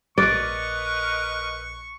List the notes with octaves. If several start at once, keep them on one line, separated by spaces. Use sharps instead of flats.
A#1 A#4 B4 D5 D#5 C#6